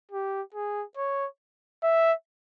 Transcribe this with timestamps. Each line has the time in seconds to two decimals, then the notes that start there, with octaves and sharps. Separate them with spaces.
0.12 G4
0.54 G#4
0.97 C#5
1.83 E5